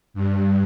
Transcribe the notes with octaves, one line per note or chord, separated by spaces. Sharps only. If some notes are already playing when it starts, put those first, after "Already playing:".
G2